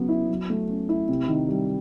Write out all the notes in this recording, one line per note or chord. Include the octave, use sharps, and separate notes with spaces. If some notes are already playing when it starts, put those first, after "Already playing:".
Already playing: C#3 F#3 B3
E4
F#3
A3
C#4
E4
C3
D#3
G3